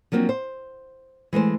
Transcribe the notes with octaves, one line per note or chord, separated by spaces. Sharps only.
F3 F#3 A#3 C4 D4
C5
E3 G#3 A3 C5